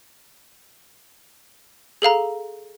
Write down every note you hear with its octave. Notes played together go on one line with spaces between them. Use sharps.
G#4 A4 F5 A#5